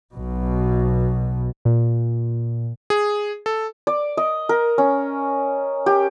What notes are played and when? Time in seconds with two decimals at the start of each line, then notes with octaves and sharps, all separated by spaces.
0.15 B1 B2
1.65 A#2
2.90 G#4
3.46 A4
3.87 D5
4.17 D#5
4.49 A#4
4.78 C#4
5.86 G4